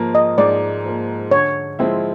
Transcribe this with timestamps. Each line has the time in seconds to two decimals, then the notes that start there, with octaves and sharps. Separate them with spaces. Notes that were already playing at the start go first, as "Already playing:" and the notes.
Already playing: G#2 F3 A#3
0.15 D#5
0.38 G#2 D5
0.85 F3 A#3
1.31 D3 C#5
1.79 F3 G#3 C4 E4